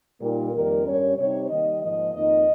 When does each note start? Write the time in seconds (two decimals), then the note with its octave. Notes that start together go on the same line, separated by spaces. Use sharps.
0.19 A#2 G3 A#3 D#4 A#4
0.53 F2 D#3 G3 A#3 A#4
0.84 G2 G3 C#4 C#5
1.16 C3 G3 C4 D#4 C#5
1.48 D#3 G3 A#3 D#5
1.81 G#2 F3 A#3 D#5
2.13 F2 D#3 A#3 D#4 D#5